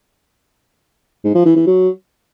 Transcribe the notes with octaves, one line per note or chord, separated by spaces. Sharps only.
G#2
F3
E3
E3
F#3